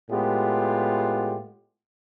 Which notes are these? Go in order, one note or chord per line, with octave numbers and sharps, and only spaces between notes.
A2 G#3 B3 F4 G4